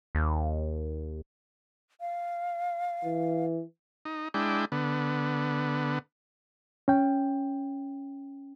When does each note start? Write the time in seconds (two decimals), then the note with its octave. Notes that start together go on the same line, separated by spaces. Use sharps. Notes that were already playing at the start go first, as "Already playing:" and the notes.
0.15 D#2
2.01 F5
3.05 E3
4.05 D#4
4.34 G#3 D4 E4 G5
4.72 D3 B3
6.88 C#4 G5